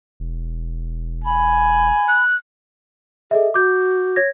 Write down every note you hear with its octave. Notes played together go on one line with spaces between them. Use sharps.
E1
G#5 B5
F#6
G#4 A4 D#5 E5
F#4 D6 G6
C#5 G#6 A#6